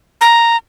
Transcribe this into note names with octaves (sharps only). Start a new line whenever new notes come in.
A#5